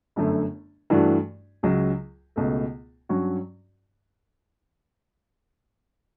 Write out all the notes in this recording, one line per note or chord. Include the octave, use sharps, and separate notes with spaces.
G1 F#2 D3 A3
G2 E3 A3 D4 F#4
C#2 C#3 F#3
C#2 B2 A3
G2 F#3 C#4 F#4